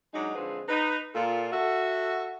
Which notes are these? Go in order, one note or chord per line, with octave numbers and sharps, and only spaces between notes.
F#3 G#3 D4 D#4
D3 F3 G#3 C4 G#4 B4
D#4 B4
A#2 F4 A4
F#4 A4 E5